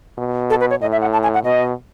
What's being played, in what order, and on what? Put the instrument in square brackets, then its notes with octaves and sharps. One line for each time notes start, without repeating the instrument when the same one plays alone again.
[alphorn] B2
[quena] A4
B4
C#5
[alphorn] A2 [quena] D#5
[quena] E5
F#5
A5
G#5
F#5
[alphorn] B2 [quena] D#5